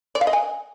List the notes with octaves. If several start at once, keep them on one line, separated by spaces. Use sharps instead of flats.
D5
F5
D#5
G#5